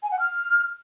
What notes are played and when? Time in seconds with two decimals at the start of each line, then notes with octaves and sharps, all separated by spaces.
0.03 G#5
0.11 F#5
0.20 F6